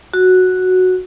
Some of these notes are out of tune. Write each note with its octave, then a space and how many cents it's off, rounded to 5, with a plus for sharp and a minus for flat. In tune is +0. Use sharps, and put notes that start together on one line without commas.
F#4 -5